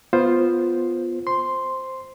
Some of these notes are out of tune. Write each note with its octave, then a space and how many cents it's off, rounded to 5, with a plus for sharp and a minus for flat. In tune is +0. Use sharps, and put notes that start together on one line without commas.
B3 +0 F4 +0 C5 +5
C5 +0 C6 +0